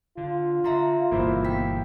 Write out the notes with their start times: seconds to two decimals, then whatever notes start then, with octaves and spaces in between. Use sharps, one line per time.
0.17 D3 F4
0.64 D3 E5 A#5 C6
1.12 G1 B2 E3 A#3 E4 C5
1.45 B3 G5 B6